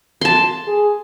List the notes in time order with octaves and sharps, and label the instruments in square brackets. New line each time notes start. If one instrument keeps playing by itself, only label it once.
[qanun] A5 C6
[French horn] G#4